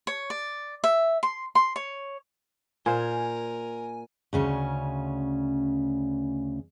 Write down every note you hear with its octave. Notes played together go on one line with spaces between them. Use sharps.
C#5
D5
E5
C6
C6
C#5
A#2 A#4 C5 G#5
D2 C#3 C#4